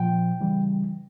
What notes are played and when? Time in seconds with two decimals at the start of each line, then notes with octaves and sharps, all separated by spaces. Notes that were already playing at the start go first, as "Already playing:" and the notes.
Already playing: A#2 F3 G5
0.41 C#3 E3 G3